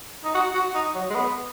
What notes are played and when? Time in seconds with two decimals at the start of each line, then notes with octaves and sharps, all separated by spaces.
0.24 D#4
0.35 F#4
0.54 F#4
0.75 D#4
0.95 F#3
1.10 G#3
1.15 B3